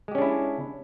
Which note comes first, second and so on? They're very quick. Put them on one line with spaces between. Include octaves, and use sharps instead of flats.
G#3 G4 C#4 D4 E4